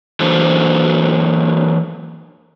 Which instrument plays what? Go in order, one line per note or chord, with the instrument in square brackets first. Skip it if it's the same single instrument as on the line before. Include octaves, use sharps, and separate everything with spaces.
[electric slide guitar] E3 F#3 A#3 D4 A4 C5